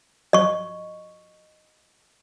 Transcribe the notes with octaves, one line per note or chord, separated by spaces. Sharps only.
D#5 C#6